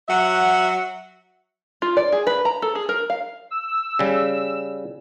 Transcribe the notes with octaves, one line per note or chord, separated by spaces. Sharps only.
F#3 E5 F#5
F4
D5
G#4
B4
A#5
A4
G#4
A#4
F5
E6
C#3 G3